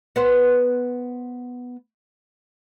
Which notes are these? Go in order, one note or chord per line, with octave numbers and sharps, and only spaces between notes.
B3 B4 C5